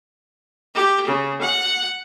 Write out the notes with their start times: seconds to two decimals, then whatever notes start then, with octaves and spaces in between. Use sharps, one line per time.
0.75 G4
1.08 C#3
1.43 F#5